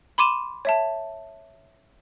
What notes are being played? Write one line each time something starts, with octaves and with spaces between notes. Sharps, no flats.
B5 C6 D6 D#7 E7
C#5 E5 A5